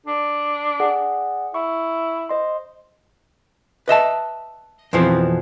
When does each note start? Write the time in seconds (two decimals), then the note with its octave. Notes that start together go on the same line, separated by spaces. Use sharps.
0.06 D4
0.80 G#4 D5 F#5
1.54 E4 C#6
2.29 C5 D#5 C6
3.88 B4 D#5 E5 A5
4.93 F2 B2 E3 F3 C4